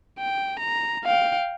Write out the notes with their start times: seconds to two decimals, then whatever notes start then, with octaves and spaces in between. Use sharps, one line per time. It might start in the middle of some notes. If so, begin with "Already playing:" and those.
0.19 G5
0.60 A#5
1.05 F5 G5